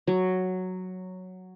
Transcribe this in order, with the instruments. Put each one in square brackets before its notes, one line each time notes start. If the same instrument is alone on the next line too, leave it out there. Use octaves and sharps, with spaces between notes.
[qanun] F#3